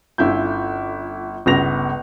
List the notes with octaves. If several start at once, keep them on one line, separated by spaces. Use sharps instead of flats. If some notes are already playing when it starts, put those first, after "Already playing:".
G1 D3 C#4 E4 F4 G6
G1 C#2 C#3 B3 A#6 F7